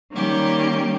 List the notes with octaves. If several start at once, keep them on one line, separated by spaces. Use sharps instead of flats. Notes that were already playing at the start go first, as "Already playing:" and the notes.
D#3 G3 A#3 C#4 G4